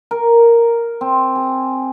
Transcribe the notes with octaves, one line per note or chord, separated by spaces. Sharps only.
A#4
C4
G#4